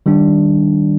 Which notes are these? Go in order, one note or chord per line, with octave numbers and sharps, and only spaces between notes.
D#3 G3 D4